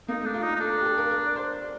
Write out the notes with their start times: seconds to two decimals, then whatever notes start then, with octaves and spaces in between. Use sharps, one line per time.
0.08 A#3 D#4
0.21 A3
0.26 D4
0.34 F4
0.43 D#4
0.55 D#4
0.60 D4 A4
0.72 A4
0.81 G4
0.85 A4
0.98 A#4
1.11 A#4
1.26 D5
1.36 C5
1.62 D5